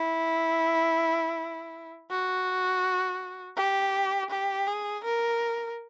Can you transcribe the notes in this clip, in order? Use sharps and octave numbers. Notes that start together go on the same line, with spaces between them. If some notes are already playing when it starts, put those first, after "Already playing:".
Already playing: E4
F#4
G4
G4
G#4
A#4